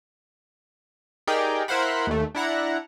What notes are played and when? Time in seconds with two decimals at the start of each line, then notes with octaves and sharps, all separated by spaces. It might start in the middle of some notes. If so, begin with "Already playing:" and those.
1.27 D#4 G4 G#4 A#4 D5 G5
1.68 E4 A#4 C5 F5 F#5 B5
2.07 D#2 A3
2.35 D4 E4 F#5 A#5